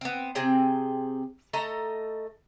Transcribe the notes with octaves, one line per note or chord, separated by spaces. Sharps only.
B3 C4
C3 C4 G#4 G5
A3 A4 D#5 A#5